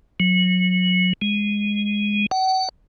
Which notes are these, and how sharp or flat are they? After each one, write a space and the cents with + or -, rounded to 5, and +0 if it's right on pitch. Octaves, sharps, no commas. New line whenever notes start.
F#3 -20
G#3 -10
F#5 +40